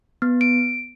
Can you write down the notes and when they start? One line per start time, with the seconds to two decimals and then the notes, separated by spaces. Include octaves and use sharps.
0.22 B3
0.41 D7